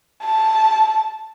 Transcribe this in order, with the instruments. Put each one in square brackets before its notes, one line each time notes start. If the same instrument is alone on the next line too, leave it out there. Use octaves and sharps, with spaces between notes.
[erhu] A5